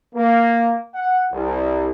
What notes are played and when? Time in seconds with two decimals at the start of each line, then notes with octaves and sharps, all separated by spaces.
0.14 A#3
0.94 F#5
1.32 C2